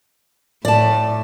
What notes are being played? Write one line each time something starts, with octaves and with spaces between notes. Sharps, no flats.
A2 D5 A5